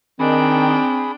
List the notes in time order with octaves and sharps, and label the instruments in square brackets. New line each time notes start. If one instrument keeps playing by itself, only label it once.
[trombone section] D#3 [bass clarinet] C4 [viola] D4 G5 [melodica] G#4 B5